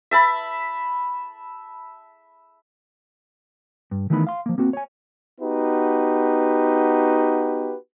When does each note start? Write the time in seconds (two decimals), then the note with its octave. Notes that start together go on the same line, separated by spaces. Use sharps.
0.11 E5 A5 B5
3.91 G2
4.10 D#3 E3 A3 B3 D#4 B5
4.27 F5 C6
4.46 F3 A#3
4.58 A#3 C4 F#4
4.73 C#5 G#5
5.41 B3 D#4 F#4 G4 B4